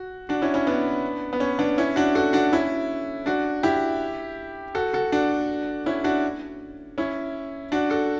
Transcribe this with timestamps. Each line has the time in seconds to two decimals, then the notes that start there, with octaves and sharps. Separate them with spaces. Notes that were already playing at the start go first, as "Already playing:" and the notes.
Already playing: F#4
0.29 D4 F#4
0.42 C#4 E4
0.54 C#4 E4
0.67 B3 D4
1.33 B3
1.40 C#4
1.59 B3 D4
1.78 C#4 E4
1.96 D4 F#4
2.15 F#4 A4
2.33 D4 F#4
2.53 C#4 E4
3.26 D4 F#4
3.63 E4 G4
4.75 F#4 A4
4.93 F#4 A4
5.12 D4 F#4
5.86 C#4 E4
6.04 D4 F#4
6.98 C#4 E4
7.72 D4 F#4
7.90 F#4 A4